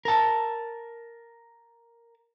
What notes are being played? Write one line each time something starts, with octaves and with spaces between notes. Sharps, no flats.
A#4 A5